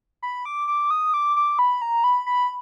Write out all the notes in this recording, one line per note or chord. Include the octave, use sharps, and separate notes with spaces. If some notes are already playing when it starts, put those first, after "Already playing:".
B5
D6
D6
D#6
D6
D6
B5
A#5
B5
B5